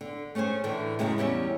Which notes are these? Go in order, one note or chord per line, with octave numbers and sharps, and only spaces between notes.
D3
A3 C#4 G#4 C5 G#5
A2 D3 E3 A3
F#2 A2 C#3 G#3
E2 G3 C#4 G4 E5